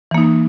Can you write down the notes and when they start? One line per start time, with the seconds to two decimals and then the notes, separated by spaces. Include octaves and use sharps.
0.11 E3
0.15 A#3
0.18 D#4